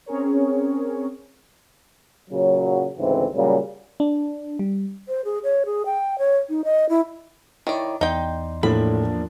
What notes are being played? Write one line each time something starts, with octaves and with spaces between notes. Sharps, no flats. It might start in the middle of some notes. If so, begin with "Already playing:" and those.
C4 C#4 G#4 A#4 C#5
A#2 C#3 F#3
D2 G#2 C#3 E3 C4
A#2 C#3 F#3 G3
D4
G3
C5
G#4
C#5
G#4
G5
C#5
D#4
D#5
E4
D#3 E4 C#5 D5
E2 D#4 D5 G5 C6
A2 F3 A#3 D4 B5